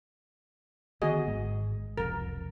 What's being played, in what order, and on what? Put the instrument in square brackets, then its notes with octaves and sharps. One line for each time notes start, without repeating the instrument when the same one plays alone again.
[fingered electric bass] D3 D#3 B3 [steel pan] F#4 G#4 D#5
[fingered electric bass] G#1 G#2
[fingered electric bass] E1 C2 F2 [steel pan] A#4